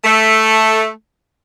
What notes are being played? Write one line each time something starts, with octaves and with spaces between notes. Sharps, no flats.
A3